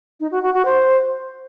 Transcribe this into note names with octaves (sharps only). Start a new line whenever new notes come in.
D#4
F#4
F#4
F#4
C5